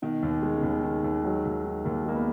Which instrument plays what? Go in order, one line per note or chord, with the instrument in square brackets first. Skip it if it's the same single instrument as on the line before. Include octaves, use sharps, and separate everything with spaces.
[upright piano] B2 [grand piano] D#3
[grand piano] D#2
G#3
[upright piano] C#3
[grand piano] D#2 [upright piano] B2
[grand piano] D#3
D#2
[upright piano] F#3 [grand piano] G#3
[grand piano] D#2
D#3
[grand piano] D#2 [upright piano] A#3
[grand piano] G#3 [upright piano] A#3
[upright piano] B3